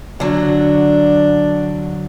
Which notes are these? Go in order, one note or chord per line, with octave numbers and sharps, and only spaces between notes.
D3 F#3 D4